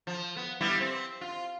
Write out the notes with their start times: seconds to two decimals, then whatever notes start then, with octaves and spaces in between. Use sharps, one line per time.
0.07 F3
0.37 B3
0.61 G3 B3 E4
0.81 C4
1.21 F4